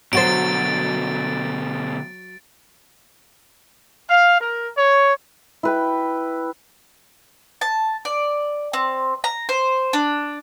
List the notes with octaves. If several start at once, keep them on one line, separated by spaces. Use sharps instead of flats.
B2 D3 F#3 F#4 C5 A6 D7
F5
A#4
C#5
E4 B4 G5
A5
D5
C4
A#5
C5
D4